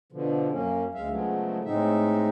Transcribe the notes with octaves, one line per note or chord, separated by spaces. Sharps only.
B2 D3 F3
F#2 A#3 C#4
D2 G#3 E5 F5
C#3 F3 F#3 G#3 A3 B3
A2 G#3 C4 D#4 E5